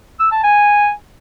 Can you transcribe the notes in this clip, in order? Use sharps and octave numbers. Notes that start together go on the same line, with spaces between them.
E6
A5
G#5